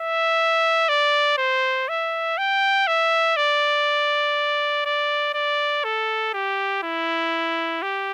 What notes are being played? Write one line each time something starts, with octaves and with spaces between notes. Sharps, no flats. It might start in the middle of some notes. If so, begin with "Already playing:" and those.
Already playing: E5
D5
C5
E5
G5
E5
D5
D5
D5
A4
G4
E4
G4